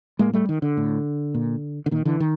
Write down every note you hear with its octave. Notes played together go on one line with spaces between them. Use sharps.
A2 G#3 A#3
G3 A3
D#3
D3
A2
A#2
D3
A#2 D#3
D3 E3
D#3